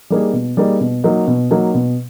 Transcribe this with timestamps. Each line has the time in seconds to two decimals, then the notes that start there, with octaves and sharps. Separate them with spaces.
0.10 G3 A#3 D#4 G#4
0.33 B2
0.57 G3 A#3 D#4 G#4
0.81 B2
1.04 F#3 A#3 D#4
1.28 B2
1.51 F#3 A#3 D#4
1.75 B2